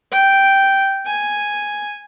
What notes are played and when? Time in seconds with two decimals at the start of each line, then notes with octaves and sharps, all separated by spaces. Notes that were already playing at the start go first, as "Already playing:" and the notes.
0.12 G5
1.06 G#5